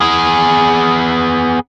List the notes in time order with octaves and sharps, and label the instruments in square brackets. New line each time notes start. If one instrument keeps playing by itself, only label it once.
[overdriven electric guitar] B3 G#4